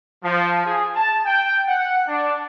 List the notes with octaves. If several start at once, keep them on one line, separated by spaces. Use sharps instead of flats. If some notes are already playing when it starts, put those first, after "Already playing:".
F3
G#4
A5
G5
F#5
D4